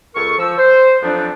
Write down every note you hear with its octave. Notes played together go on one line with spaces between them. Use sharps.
C#2 A4 A#4 C#6
F3 E6
C5
F2 F3 F#3 A3 B3 D4